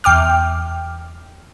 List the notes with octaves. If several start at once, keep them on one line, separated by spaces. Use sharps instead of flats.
E2 G5 D6 F6